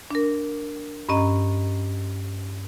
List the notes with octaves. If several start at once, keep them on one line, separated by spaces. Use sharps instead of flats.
D4 A#4
G2 C#4 D#5 A#5